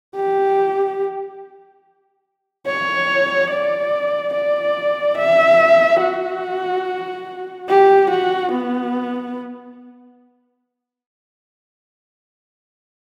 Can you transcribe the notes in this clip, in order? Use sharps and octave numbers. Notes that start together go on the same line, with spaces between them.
G4
C#5
D5
D5
E5
F#4
G4
F#4
B3